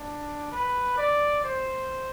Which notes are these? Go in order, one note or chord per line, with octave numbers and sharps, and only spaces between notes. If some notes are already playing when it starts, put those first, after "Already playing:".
Already playing: D4
B4
D5
C5